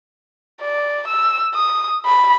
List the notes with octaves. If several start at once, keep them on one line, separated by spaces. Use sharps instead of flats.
D5
E6
D#6
B5